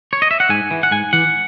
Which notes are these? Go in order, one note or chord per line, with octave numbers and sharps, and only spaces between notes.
C#5
D#5
E5
F#5
G#2 G#5
E3
F#5
G#2 G#5
E3 F#5